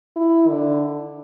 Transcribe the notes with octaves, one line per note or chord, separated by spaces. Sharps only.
E4
D3